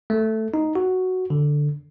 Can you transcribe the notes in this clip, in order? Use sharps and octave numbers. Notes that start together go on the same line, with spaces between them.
A3
D#4
F#4
D3